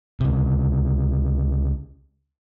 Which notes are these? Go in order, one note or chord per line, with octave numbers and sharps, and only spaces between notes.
C#2 C3